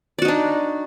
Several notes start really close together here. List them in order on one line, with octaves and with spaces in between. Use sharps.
D5 F#4 D#4 D4